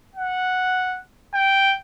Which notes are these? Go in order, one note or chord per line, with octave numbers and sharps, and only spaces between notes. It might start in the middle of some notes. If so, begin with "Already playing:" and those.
F#5
G5